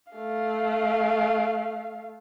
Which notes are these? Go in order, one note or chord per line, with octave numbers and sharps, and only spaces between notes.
A3 F5